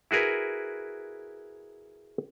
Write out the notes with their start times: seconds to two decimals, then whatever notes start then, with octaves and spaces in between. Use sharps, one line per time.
0.11 E4 F#4 G#4 A#4 B4